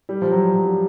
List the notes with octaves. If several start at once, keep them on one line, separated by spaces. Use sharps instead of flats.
G3
F3
F#3
F#3
G3